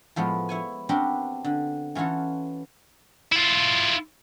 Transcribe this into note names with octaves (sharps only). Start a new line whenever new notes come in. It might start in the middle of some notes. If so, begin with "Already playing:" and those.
A2 F3 G#3 B3
E4 C#5 G#5
B3 C4 D4 F#4 G4 A#4
D3
E3 C#4 F4 F#4 A4
E4 F4